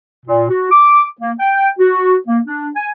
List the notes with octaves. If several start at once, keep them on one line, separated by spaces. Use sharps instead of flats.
A#2
F#4
D6
A#3
G5
F#4
A#3
D4
G#5